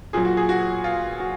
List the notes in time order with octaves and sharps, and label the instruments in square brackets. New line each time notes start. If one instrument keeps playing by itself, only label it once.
[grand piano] A#2 F#3 G#4
F#4
G#4
F#4
F4
F#4